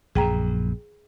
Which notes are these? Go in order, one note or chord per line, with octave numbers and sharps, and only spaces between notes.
A#1 F#2 G#4 G5 A#5